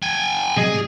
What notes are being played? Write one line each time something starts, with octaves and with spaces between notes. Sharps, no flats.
G5 G#5
C3 F#3 G#4 D#5
A2 F#3 G3